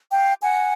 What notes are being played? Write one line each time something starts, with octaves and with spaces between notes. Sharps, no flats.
F5 G5
F#5 G#5